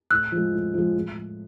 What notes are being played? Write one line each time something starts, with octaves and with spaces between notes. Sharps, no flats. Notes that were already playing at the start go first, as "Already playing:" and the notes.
A2 E6 F#6
F3 G#3
A2
F3 G#3
A2